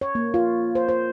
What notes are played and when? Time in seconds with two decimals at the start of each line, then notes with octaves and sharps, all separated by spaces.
0.01 C#5
0.15 A#3
0.34 F4
0.75 C5
0.89 C5